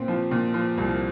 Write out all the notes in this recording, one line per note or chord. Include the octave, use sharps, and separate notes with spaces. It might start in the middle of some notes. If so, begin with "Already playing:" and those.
Already playing: A#2 C4
F3
A#2
F3
C2